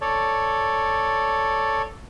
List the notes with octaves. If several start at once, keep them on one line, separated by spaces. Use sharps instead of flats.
A4 C#5 D5